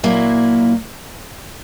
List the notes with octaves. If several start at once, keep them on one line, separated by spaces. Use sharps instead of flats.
A#2 F#3 A#3 E4